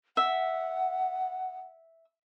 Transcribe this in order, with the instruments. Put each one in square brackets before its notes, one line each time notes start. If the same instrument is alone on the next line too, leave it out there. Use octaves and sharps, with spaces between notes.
[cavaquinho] E5 [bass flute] F#5